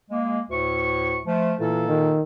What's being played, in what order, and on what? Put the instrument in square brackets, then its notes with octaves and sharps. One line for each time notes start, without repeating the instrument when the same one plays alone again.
[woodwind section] G#3 A#3
D2 A2 C#6
F3 A3
[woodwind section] A#2 A#3 A4 [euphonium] E3
[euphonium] D#3